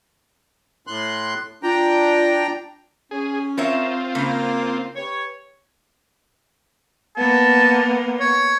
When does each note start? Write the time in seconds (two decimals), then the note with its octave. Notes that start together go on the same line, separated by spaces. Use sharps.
0.87 A2 C6 F#6
1.63 D4 F4 G5 A#5
3.11 C#4 G#4
3.58 C4 F4 A#4 C#5 E5
4.15 C#3 A#3
4.95 G4 B4 C#5
7.17 A#3 B3 A5
8.20 C#5